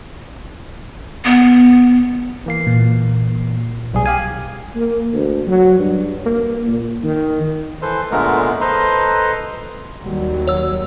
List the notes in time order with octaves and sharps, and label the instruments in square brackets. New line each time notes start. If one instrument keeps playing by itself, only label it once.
[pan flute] B3
[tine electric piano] E3 A#3 C7
[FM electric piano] A#2
[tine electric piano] B1 G3 G#4
G4 F5 G#5
[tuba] A#3
D2
F#3
G2
A#3
A#2
D#3
[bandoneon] E3 A4 B4 C5 C6
A#2 D3 G#3 A3 B3 A#4
A4 B4 C5 D#5 A#5 C6
[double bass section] D#2 F#3 G3
[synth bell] C#5 E6